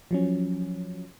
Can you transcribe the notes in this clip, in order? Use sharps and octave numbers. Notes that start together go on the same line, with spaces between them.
F3 F#3 C#4